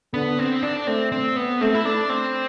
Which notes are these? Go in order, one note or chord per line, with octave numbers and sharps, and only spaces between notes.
D3 B3
C4
D4
A3 C4
C4
B3
A3 C4
E4
D4
C4